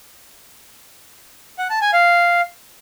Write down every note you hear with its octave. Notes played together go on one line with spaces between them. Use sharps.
F#5
A5
G#5
F5